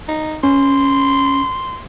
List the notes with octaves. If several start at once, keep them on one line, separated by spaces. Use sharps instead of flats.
D#4
C#4 C6